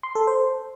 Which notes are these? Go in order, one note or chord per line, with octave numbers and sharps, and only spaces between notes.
C6
A4
C5